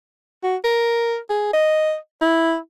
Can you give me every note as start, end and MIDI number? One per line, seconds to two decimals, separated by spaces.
0.43 0.56 66
0.64 1.17 70
1.30 1.50 68
1.54 1.95 75
2.22 2.56 64